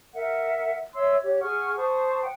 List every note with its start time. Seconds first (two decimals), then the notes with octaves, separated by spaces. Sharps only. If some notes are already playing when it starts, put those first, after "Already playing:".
0.15 A#4 E5 F#5
0.94 C#5 E5 C6 E6
1.22 G4 C#5
1.41 G#4 F#5 C#6 F6
1.76 C5 A5 C#6 D#6
2.22 F#5 G5